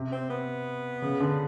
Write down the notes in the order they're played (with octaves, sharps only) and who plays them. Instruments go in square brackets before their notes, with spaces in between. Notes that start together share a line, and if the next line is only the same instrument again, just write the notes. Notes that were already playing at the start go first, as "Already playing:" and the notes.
Already playing: [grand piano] C3
[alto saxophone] C4
B3
[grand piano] C#3
D3